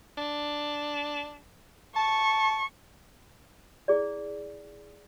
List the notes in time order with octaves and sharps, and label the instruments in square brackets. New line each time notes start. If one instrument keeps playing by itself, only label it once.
[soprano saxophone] D4
[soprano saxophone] A5 [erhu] C#6
[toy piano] E4 G#4 D5